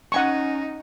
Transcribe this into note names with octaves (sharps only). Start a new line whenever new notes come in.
C#4 D#4 F#5 G#5 C#6